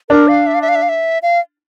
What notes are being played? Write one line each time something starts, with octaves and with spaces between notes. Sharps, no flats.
D4 A#4
F5
E5
F5
E5
F5
E5
F5
E5
F5